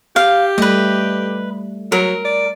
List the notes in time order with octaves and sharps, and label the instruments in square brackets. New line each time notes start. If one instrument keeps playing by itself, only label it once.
[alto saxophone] G4 [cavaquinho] F5
[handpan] G3 A3 [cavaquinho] B4 D#5
[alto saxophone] F#3 [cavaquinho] A#4
[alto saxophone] D5